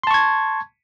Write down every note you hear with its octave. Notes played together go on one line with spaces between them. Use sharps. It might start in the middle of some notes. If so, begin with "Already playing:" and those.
A5 C6 C#6 G#6